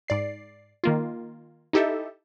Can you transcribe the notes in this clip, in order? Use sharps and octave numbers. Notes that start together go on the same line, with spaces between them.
G#2 D5 C7
D#3 A#3 F4
D#4 E4 G4 A4 D#5 E5